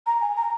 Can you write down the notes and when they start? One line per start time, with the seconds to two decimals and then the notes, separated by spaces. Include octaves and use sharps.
0.06 A#5
0.21 G#5
0.36 A#5